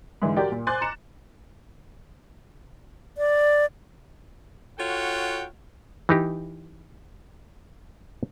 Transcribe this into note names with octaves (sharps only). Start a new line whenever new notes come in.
G#2 D3 E3
F#4 G4 A#4 D5 G5
A#2
C5 G#5 C6 D6 F#6 A6
A#5 C#7 E7
D5
F4 F#4 A4 C#5 F#5 G5
E3 D#4 G4